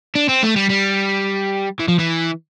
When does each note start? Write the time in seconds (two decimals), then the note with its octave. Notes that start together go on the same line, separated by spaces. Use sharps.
0.15 D4
0.29 C4
0.43 A3
0.56 G3
0.69 G3
1.80 E3
1.88 F3
1.99 E3